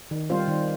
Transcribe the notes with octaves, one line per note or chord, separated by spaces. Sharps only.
D#3
G3 C4 F4 C5
D#3